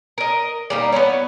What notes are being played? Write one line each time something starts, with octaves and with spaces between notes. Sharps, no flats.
A#4 D#5
G3 A#3 D#4
B3 C#4 E4 C#5